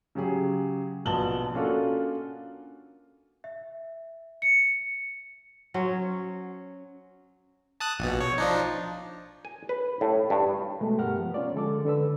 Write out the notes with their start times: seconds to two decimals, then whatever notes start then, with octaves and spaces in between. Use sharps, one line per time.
0.15 C#3 F#3 G4 G#4
1.05 A#1 B2 A5 F#7 G7
1.54 A#3 C#4 D4 F4 F#4 A4
3.44 E5
4.42 C#7
5.74 F#3 C#4 C5
7.80 A5 D#6 F#6
7.99 A#1 B2
8.21 C#5
8.38 F3 D4 D#4
9.45 G#5
9.69 B4
10.01 A2
10.30 G2
10.81 B2 G#3 A3
10.98 G2 G4 A#4 F#5 F6
11.17 B2 F3 B3
11.34 C#4 F4 C#5 D5
11.54 D3 G#3 A4 D6
11.85 D3 A4 B4 E6